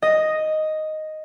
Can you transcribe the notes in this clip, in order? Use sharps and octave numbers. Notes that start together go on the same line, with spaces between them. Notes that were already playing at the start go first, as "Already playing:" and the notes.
D#5